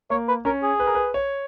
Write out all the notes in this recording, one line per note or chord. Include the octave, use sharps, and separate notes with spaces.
A#3 C#5
B4
C#4 A#4
G#4
B4
A#4
B4
C#5